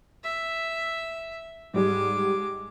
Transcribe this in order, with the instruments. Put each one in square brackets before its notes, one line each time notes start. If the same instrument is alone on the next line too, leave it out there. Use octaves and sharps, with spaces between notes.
[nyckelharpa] E5
[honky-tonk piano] G#2 G3 [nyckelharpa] G#3 D6